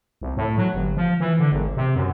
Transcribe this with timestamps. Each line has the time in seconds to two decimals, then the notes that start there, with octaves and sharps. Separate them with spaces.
0.22 C2
0.37 A2
0.57 F#3
0.74 G1
0.97 F3
1.20 E3
1.39 D3
1.52 G#1
1.77 C3
1.96 F#2